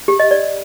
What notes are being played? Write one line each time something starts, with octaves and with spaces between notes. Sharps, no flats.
G4
D#5
D5